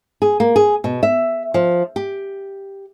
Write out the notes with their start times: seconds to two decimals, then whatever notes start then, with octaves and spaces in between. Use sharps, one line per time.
0.22 G#4
0.40 A#3
0.56 G#4
0.84 B2
1.03 E5
1.54 F3
1.96 G4